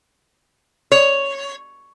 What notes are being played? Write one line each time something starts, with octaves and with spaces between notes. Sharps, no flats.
C#5